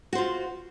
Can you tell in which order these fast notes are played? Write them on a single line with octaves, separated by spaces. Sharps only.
F#4 C5 F4